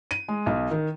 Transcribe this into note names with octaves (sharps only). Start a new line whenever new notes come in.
D#7
G#3
B1
D#3